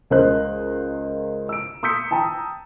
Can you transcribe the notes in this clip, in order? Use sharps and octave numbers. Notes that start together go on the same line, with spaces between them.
C#2 A#4 C5 D#5 F#6
E6 D7
C6 D#6 E6 G6 B6 C#7
G5 A5 A#5 D#6